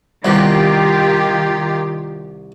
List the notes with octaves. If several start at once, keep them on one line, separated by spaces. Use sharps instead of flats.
C2 D#3 B3 F4 G4